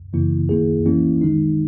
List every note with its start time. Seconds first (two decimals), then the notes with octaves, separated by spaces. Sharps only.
0.13 F#2 C#3 E3 A#3 E4
0.49 D#3 A#3 E4 G#4
0.86 E3 A#3 C#4 E4
1.21 D#3 G#3 D#4